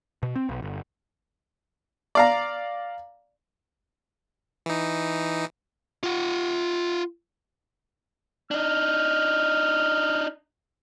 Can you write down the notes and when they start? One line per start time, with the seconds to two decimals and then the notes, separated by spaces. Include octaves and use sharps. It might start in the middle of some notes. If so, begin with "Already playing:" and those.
0.23 B2
0.36 C4
0.49 B1
0.62 G1
2.15 D5 F5 A#5
4.66 E3 D#4
6.03 F4 F#5
8.51 D4 D#4 F6